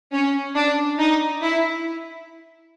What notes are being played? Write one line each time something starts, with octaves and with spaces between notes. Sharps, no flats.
C#4
D4
D#4
E4